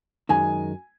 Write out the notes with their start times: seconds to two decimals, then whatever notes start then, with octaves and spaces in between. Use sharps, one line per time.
0.29 F#2 D#3 G#3 G#5